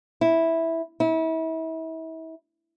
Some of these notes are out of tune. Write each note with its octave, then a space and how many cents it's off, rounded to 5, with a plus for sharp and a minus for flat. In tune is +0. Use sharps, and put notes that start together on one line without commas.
E4 -5
E4 -35